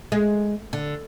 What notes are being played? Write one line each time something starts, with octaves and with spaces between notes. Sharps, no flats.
G#3
D3